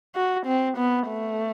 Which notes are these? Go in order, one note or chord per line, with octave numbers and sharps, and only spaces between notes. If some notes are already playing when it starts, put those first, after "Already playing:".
F#4
C4
B3
A3